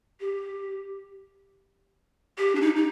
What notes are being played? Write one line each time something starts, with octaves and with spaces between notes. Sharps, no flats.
G4
G4
D4
D#4
D#4